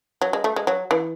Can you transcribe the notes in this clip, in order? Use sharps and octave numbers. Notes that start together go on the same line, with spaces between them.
F#3
G#3
A3
G#3
F#3
E3